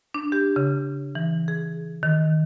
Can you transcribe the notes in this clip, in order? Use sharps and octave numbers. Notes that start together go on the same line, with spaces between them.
D4
G4
C#3
E3
G#4
D#3